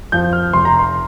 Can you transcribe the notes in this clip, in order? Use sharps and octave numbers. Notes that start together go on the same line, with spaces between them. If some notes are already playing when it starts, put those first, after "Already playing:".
F2 F3 G6
F6
F1 C6
A#5
C6